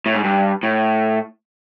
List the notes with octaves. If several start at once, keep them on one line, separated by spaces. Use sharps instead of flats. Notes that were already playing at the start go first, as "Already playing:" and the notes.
A2
G#2
G2
A2